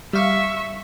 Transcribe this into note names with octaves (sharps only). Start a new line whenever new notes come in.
G3 E5 F5 C#6